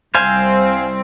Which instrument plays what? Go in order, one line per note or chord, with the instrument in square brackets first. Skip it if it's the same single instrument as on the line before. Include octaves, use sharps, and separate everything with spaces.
[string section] C2 C4 [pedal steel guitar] C5 F5 G#5